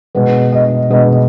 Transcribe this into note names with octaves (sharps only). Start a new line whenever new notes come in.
B2 G#3 B3
D#5
B2 G#3 B3 D#5